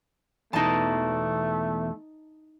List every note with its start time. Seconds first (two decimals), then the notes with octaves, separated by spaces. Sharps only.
0.53 E2 B2 E3 A3 D#4 A5